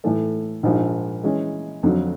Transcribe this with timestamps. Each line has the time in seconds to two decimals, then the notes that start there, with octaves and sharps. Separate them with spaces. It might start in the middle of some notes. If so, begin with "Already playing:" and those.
0.04 A2 E3 A3
0.63 A#1 G#2 F3
1.23 E3 G#3 C#4
1.83 F2 D3 F#3